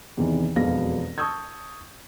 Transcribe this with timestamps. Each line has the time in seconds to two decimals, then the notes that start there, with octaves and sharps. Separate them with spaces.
0.17 E2 C3 D#3 E3
0.56 E1 B1 F2 B3 F5 A#6
1.18 A5 C#6 D#6 E6 G6 G#6